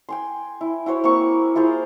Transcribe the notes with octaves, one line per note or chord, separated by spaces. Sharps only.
G5 G#5 C6
E4
E4 F#4 C5 C#5
A#3 C4 E4 C#6
E4 F4 G#4 C5